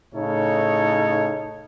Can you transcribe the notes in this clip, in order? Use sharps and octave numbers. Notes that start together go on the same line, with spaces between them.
A2 C#3 D#4 A4 C#5